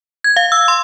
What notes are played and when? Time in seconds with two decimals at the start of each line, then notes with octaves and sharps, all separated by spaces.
0.24 G#6
0.37 F5
0.52 E6
0.68 C6